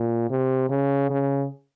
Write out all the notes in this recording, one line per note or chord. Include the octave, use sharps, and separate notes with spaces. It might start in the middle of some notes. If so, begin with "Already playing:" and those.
Already playing: A#2
C3
C#3
C#3